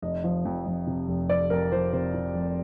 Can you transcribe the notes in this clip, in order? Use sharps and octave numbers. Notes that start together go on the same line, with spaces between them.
F1 D#5
F3
F2
F2
C3
F1
F2 D5
F2 A#4
F3 C5
C3 C5
C3
F1